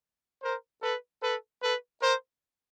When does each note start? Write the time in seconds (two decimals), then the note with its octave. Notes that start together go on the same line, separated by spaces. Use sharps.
0.43 A#4 C5
0.82 A4 B4
1.23 A4 B4
1.62 A4 B4
2.02 A#4 C5